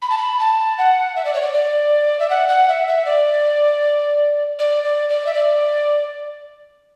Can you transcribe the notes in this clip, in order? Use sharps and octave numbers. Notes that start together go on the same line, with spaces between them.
B5
A5
B5
A5
F#5
E5
D5
C#5
D5
D5
E5
F#5
F#5
E5
E5
D5
D5
D5
D5
E5
D5